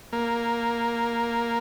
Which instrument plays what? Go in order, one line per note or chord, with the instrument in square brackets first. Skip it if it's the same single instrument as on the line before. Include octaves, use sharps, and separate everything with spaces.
[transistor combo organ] A#3